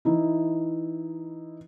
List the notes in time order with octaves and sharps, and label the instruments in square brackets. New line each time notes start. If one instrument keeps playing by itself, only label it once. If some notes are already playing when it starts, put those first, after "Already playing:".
[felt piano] E3 D#4 E4